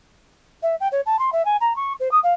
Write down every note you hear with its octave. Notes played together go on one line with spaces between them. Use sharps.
E5
G5
C#5
A5
C6
E5
G#5
A#5
C#6
C5
D#6
F5